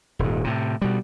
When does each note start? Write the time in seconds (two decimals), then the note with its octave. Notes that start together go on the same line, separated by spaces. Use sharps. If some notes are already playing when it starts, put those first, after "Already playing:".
0.19 D#1 G#2
0.44 A2 C3
0.82 B2 G3